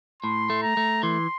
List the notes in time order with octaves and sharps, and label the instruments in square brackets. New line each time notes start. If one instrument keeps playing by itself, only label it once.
[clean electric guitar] A2 [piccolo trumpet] C6
[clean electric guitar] A3
[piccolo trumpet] A#5
[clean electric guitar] A3
[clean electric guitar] E3 [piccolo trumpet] C6